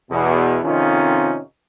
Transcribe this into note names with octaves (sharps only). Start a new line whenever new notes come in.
E2 B2
F2 C3 D#3 C#4 D#4 F4